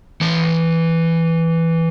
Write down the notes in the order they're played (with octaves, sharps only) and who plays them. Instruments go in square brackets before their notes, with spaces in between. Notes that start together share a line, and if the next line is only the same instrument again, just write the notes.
[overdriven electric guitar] E3 A5